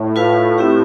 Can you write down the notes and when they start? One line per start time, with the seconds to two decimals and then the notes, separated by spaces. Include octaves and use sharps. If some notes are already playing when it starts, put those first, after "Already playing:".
Already playing: A2
0.16 F4 B4 F5
0.58 C4 E4 G4